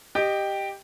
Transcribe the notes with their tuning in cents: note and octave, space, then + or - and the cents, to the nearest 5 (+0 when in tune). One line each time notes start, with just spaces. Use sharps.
G4 +0 D#5 -15 G5 +0